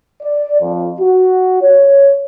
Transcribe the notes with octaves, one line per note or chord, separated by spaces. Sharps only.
D5
F2
F#4
C#5